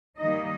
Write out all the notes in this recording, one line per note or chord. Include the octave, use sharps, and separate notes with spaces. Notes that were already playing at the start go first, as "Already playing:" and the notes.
D#3 G3 A#3 D#4 D#5